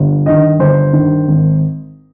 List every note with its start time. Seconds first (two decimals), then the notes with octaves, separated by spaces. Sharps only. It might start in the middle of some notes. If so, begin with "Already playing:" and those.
Already playing: G1
0.26 G2 D#3 D#5
0.60 G1 C5
0.93 G2 D#3
1.27 G#1